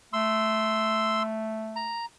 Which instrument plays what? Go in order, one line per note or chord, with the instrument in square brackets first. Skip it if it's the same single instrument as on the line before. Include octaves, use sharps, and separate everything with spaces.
[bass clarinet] A3 [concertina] C6 E6
[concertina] A#5